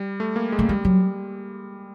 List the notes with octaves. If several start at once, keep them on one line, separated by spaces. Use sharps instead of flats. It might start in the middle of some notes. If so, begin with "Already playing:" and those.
Already playing: G3
A3
A#3
G#3
A3
G3 G#3
F#3 G3